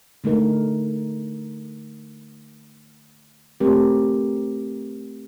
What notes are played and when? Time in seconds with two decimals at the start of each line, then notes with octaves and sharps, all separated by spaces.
0.24 D3 A3 D#4 A#4
3.60 A3 C4 G4 A#4